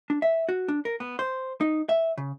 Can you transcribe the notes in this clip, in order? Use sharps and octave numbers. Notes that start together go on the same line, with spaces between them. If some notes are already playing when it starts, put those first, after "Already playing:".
D4
E5
F#4
D4
A#4
B3
C5
D#4
E5
C#3